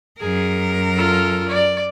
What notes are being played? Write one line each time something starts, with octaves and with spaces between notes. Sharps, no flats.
F#2 G#4 A#4
F4 A4
D5